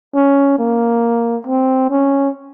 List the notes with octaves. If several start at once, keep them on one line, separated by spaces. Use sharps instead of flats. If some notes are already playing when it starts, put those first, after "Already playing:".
C#4
A#3
C4
C#4